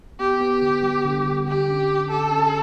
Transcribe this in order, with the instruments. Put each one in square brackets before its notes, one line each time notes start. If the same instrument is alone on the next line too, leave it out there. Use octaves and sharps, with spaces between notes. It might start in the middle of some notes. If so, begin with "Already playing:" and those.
[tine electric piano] B3 [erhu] G4
[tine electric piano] B3
D3
G3
D3
D3
[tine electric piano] D3 [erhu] G4
[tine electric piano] C#4
C#4
[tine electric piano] D3 [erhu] A4
[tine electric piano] C#4